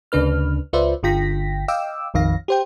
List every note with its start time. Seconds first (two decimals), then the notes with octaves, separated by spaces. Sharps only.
0.12 D2 C#3 D4 B4 F6
0.73 C#2 F4 B4 C5 D5 E5
1.03 G1 D3 F4 G5 A#6 B6
1.68 D#5 F5 G5 D6 E6
2.14 A#1 F2 D#3 F5 A#6
2.48 G4 C5 G5